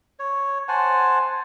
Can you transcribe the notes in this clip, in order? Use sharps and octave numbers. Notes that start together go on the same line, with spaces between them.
C#5
C5 F#5 G#5 A5